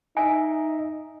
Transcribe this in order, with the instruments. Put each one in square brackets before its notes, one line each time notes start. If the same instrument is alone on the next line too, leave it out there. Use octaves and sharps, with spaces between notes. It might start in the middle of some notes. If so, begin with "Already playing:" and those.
[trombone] D#4 [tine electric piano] D#5 E5 [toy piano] G#5